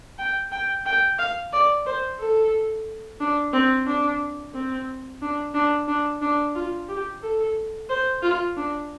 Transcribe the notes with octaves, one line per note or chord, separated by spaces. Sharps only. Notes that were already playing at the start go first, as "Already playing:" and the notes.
G5
G5
G5
F5
D5
C5
A4
D4
C4
D4
C4
D4
D4
D4
D4
F4
G4
A4
C5
F4
D4